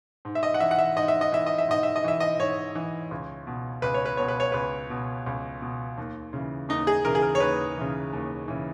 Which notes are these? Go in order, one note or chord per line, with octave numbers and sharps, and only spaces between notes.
G#2
E5
D#5
F#5
E3 E5
F#5
E5
G#2 D#5
E5
D#5
E3 E5
D#5
E5
G#2 D#5
E5
D#5
E3 E5
D#5
G#2 C#5
E3
C#2
B2
C#2 B4
C#5
B4
B2 C#5
B4
C#5
C#2 B4
B2
C#2
B2
D#2
C#3 E3
D#2 D#4
G#4
C#3 E3 A#4
G#4
A#4
C#5
D#2 B4
C#3 E3
D#2
C#3 E3